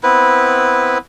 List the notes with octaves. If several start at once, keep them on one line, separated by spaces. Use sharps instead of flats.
B3 C4 E4 B4